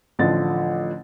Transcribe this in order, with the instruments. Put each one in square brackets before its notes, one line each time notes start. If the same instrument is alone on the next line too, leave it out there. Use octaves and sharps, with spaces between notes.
[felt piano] A1 D3 F3 A6